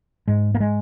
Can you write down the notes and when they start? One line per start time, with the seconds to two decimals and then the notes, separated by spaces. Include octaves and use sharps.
0.28 G#2 G#3
0.55 A#3
0.60 G#3